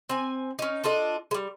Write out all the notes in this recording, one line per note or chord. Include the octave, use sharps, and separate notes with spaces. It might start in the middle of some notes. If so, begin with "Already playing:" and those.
C4 G#5
C#4 D#4
D4 F4 A4 D#5
G3 G#3